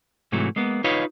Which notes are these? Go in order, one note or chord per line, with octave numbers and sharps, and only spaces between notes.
G#2 C3 E3 F#3 A3
G#3 A#3 B3
D#4 F4 B4 C#5 D#5 F5